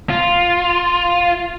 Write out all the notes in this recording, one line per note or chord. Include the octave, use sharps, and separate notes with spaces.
F4